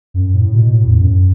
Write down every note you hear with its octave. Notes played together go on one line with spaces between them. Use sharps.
F#2
A2
B2
A2
E2
F#2